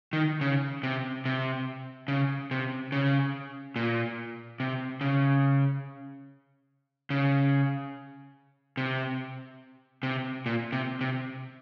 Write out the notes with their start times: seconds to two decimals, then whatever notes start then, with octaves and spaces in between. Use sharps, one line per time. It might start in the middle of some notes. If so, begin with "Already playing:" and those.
0.13 D#3
0.41 C#3
0.83 C3
1.25 C3
2.08 C#3
2.51 C3
2.92 C#3
3.76 A#2
4.60 C3
5.01 C#3
7.10 C#3
8.77 C3
10.03 C3
10.46 A#2
10.73 C3
11.01 C3